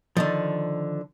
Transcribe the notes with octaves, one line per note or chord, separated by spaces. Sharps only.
D3 D#3 F3